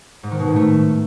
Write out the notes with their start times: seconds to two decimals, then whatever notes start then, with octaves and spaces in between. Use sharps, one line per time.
0.23 G#2
0.31 D#3
0.40 B2
0.48 A2
0.56 A3